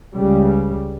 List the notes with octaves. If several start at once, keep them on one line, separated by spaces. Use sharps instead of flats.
C#2 C#3 G3